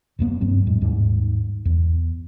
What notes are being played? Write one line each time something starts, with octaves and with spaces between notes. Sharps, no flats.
D#1 F#2 A#3 B3
G2 F#3 C4
F2 A2 G#3
D#2 G#2 G3
E2